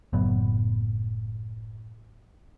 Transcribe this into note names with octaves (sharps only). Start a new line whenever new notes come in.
F#1 A2 F#3 B3